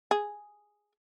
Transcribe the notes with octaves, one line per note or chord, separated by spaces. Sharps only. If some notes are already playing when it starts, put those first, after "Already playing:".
G#4